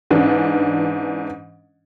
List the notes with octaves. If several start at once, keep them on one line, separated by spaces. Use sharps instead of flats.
G#2 E3 C#4 D4